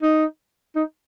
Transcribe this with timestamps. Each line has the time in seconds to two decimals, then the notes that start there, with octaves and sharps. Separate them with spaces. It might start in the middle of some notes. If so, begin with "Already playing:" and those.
0.03 D#4
0.75 D#4